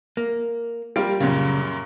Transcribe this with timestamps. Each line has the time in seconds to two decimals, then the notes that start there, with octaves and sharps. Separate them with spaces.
0.17 A#3
0.96 G3 A#3 F4 D7
1.20 F#2 A#2 C#3 A#3